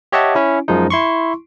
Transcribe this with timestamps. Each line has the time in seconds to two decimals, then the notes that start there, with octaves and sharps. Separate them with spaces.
0.12 G4 C#5 D#5 E5 F#5 A5
0.35 C#4 E4
0.68 F#2 F3 G#3 D#4
0.90 E4 C6 C#6